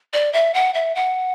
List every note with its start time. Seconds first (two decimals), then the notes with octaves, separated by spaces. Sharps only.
0.13 D5
0.33 E5
0.54 F#5
0.74 E5
0.95 F#5